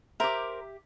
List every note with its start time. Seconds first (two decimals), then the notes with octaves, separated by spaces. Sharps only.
0.20 G4 A#4 C5 E5